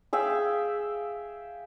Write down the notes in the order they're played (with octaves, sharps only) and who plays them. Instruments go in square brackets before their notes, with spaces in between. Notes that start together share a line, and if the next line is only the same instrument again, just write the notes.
[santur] G#4 E5 F5 G5